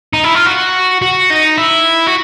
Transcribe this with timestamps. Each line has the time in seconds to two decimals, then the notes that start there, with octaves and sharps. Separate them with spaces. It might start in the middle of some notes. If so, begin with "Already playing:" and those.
0.13 D#4
0.24 E4
0.35 F4
0.46 F#4
1.02 F#4
1.30 D#4
1.58 E4
2.07 F#4